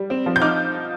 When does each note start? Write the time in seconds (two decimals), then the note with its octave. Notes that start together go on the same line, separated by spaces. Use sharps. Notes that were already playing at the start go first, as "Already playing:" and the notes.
Already playing: G3
0.10 C4
0.26 F3
0.36 G6
0.42 D#4 D6 F6